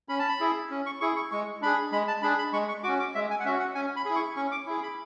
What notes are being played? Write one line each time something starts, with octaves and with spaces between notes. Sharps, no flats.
C#4 B5
A5
B5
E4 G#4
C#4
C#6
E4 G#4 C#6
C#6
G#3 C#6
D4 G#4 B5
G#3 B5
A5
D4 G#4 B5
B5
G#3 C#6
C#6
C#4 F#4 D6
D6
G#3 E5
G#5
F#5
C#4 F#4 E5
F#5
C#4 G#5
B5
E4 G#4
C#6
C#4 C#6
D6
E4 G#4
B5